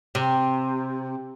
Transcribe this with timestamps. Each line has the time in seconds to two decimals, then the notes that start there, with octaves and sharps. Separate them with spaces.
0.15 C3